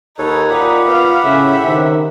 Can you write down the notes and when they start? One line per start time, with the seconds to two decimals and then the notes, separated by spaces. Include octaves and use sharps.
0.18 D#2 D#4 A4 B4 C#5
0.50 A#2 F4 G4 F#5 B5
0.87 B3 F5
1.24 A2 C#3 E5
1.66 C3 D#3